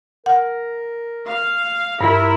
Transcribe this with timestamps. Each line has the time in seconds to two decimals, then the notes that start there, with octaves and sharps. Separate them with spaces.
0.26 A#4 F#5
1.28 F5
2.01 G2 E4 F4 A#4